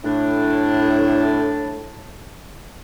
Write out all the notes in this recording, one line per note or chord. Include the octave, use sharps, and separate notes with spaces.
A2 D4